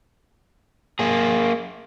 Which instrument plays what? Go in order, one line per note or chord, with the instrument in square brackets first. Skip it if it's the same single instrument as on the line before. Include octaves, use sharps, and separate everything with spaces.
[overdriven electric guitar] A#3 G#4